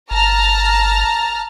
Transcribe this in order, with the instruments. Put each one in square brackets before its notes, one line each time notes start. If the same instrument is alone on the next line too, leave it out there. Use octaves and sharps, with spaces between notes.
[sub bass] G1 [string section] A5 A#5 F6